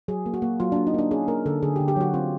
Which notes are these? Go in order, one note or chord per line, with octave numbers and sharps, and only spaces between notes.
F#3 G#4
A#3
F#4
A#3
F#3 F4
D4
A#3
D#4
A#3 D4
C#4 G#4
A#3 A#4
D3 A4
D3 G#4
G4
D3
G4
F#3 F#4
C4 F4